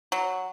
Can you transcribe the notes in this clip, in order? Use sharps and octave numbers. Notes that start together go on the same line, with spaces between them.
F#3